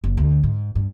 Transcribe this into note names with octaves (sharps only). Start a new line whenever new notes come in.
F#1
D2
G#2
G2